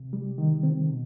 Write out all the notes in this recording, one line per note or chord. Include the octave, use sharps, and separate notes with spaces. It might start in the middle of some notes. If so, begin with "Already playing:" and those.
Already playing: C3
G3
D#3
C4
B2